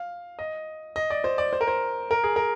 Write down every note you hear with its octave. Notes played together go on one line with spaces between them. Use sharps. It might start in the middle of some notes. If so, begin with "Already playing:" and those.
Already playing: F5
D#5
D#5
D5
C5
D5
C5
A#4
C5
A#4
G#4
A#4